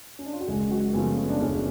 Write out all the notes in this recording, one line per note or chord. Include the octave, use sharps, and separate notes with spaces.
C#4
D4
F4
F#4
F#1 G#3 G#4
F#3 F#4
F#2 C#3 F3 A3 B3
B3
D4
F#1 C#3 C#4